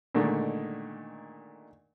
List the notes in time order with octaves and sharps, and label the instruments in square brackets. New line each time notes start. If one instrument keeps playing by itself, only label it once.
[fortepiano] A#2 D3 D#3 G#3 A3